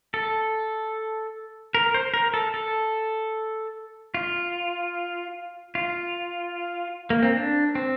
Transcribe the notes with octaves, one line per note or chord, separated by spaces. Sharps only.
A4
A#4
C5
A#4
A4
A4
F4
F4
A#3
C4
D4
C4